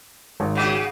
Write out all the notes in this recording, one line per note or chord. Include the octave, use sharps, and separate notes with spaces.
G#1
C#3 F#4 D#5